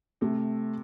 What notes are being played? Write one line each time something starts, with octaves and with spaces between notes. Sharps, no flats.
C3 A3